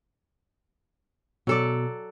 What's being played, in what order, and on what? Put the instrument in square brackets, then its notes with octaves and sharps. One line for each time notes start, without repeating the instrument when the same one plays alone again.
[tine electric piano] B2 [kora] F#3 A4 D5